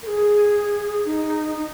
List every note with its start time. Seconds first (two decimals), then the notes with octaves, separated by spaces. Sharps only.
0.02 A#4
0.07 G#4
1.05 D#4
1.56 D#4